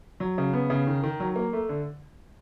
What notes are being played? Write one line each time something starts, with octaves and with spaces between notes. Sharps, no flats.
F#3
C#3
B3
C#3
D#3
D#3
F#3
A#3
A3
D3